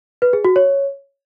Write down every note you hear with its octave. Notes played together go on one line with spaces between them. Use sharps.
B4
G#4
F#4
C#5